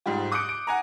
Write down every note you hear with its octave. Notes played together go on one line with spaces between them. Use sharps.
G#2 F3 G3 G4
D6 D#6 F#6 G6 C#7 D7
D7
F#5 G#5 A#5